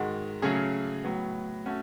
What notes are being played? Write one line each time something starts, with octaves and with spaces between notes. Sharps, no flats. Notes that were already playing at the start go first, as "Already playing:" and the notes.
Already playing: G#2 D#3 G#3 F#4
C#3 F#3 A3 C#4 G#4
A2 F#3 B3
A3 C#4 F#4